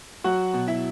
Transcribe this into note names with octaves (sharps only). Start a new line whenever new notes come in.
F#3 F#4 F#5
B2
E4 E5